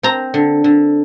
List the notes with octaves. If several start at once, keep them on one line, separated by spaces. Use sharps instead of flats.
C4 A#5
D3
D3